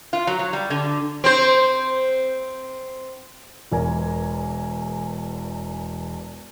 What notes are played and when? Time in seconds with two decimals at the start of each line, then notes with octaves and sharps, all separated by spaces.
0.13 F4
0.27 F#3
0.39 F#3
0.53 G3
0.70 D3
1.24 C4 C5
3.72 E1 E2 A#4 G#5